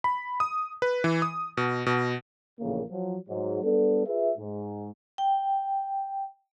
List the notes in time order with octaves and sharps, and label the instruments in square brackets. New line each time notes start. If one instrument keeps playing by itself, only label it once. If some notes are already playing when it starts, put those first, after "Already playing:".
[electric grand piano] B5
D#6
B4
E3
D#6
B2
B2
[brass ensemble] A#1 A2 C#3 E3 A#3
F3 F#3
G#2 F#3
G3 B3 D4 A4
F4 G#4 B4 E5
G#2
[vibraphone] G5